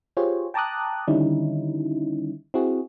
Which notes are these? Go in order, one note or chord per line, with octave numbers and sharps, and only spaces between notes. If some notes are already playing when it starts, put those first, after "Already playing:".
F4 G4 G#4 C5 C#5
G5 A5 A#5 D6 D#6 F#6
D3 D#3 G3 C#4 D#4 E4
C4 E4 F#4 G#4